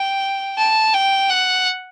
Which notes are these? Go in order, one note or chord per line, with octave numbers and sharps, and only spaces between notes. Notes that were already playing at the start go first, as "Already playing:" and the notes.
Already playing: G5
A5
G5
F#5